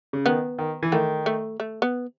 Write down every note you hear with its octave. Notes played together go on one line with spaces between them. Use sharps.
C#3
D#3 B3
D#3
E3
D#3 A3
A3
A3
B3